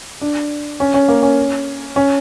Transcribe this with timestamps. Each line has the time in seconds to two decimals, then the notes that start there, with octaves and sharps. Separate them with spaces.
0.21 D4
0.80 C#4
0.94 C#4
1.08 A#3
1.23 C#4
1.96 C#4